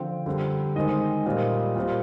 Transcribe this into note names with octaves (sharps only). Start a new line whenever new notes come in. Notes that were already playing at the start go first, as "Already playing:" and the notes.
Already playing: D3 F3 C4 G5
D3 G3 C4
D#3 G#3 C4 D#5
A#2 G3 C4
A#2 G3 C4